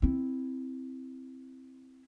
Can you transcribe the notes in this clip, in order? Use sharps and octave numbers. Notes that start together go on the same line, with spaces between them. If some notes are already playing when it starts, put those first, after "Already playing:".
C4 E4